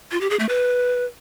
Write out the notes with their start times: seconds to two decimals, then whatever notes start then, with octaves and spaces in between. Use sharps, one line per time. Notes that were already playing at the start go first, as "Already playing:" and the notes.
0.12 F4
0.21 G4
0.30 G#4
0.40 A3
0.49 B4